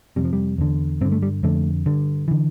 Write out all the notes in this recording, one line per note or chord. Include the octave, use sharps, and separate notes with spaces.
F2 C3 G3
F3
G3
E2 D3
G2 D3 C4
A3
G3
F2 D3 A3
G2 D3
D3 E3